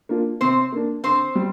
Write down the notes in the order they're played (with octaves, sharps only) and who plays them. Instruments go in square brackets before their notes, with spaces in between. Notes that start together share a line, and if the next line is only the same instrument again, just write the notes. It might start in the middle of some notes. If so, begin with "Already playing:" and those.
[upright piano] A#3 D4 F4
[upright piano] C3 [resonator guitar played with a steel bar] C4 C5
[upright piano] A#3 D4
[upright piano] D3 [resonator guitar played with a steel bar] C4 C5
[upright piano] G3